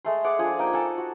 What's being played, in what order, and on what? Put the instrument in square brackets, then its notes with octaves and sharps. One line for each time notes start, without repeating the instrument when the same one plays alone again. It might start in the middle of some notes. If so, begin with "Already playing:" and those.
[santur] G#3 A3 C6
G#4 D5 F#5
F3 D4 G#4
A#3 D#4 G5
A4 F#5 G#5 A5
F#4